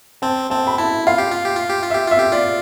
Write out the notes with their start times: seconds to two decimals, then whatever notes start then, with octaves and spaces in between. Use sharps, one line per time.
0.22 C4 A5
0.50 C4 A5
0.67 B5
0.78 E4 A5
1.07 F4 F5
1.18 G4
1.31 F4
1.45 G4
1.57 F4
1.69 G4
1.82 F4
1.90 G4 E5
2.07 F4 E5
2.19 G4
2.32 F4 D5